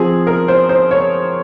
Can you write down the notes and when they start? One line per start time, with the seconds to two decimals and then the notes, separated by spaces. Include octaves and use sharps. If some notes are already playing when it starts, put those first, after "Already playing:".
Already playing: F3 C4 G#4
0.27 A#4
0.48 C5
0.69 C5
0.91 C#5